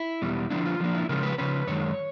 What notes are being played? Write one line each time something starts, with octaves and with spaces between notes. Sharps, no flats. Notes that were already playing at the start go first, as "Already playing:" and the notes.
Already playing: E4
E2 B2 G3
D3 F3 A#3 D4 E4
F4
D3 F3 A#3 D4
E4
C#3 F3 G#3 C#4 A#4
B4
C#3 F3 C#4 B4
F#2 D#3 G#3 C#5